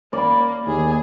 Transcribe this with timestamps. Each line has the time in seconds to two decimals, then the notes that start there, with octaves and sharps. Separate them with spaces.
0.13 A#3 D5 B5
0.67 D#2 G#4